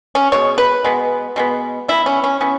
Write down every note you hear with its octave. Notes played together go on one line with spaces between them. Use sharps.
C#4
B2 G#3 C#5
B4
B2 G#3 B3
B2 G#3 B3
E3 B3 E4
C#4
C#4
E3 B3 C#4